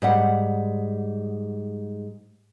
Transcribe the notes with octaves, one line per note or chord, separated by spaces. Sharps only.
G#2 G3 F#5